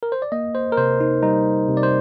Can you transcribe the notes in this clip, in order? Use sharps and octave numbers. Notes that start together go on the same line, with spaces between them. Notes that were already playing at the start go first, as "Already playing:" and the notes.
A#4
C5
D5
A#3 D#5
C5
A#4
C3 C5
D#4
G3 D#4
C3
D5
C5